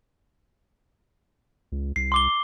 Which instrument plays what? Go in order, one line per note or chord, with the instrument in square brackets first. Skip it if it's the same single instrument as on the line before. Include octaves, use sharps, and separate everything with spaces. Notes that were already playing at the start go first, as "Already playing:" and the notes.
[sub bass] C#2
[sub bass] C2 [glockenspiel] C7
[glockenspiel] C6 D6 G7